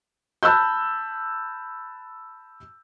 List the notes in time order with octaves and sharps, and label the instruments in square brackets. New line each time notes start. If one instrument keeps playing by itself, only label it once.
[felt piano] A5 B5 E6 F#6 G6